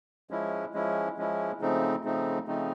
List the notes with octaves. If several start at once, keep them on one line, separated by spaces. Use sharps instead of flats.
F3 G#3 C#4 E4
F3 G#3 C#4 E4
F3 G#3 C#4 E4
C#3 F3 A3 C4 D#4
C#3 F3 A3 C4 D#4
C#3 F3 A3 C4 D#4